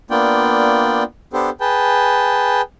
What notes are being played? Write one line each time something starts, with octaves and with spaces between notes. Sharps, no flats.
A#3 B3 D4 F4 D5 G5
B3 D4 G4 A4 C5
G#4 B4 G5 A5